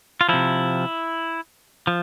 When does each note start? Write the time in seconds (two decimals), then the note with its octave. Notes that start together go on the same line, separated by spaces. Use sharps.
0.21 F4
0.29 C3 F3 E4
1.87 F3